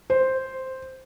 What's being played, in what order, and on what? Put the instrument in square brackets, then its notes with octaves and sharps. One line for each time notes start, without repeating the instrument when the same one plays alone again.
[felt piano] C5